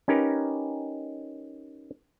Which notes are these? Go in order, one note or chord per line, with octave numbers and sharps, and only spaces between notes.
C#4 D#4 G4 A#4 B4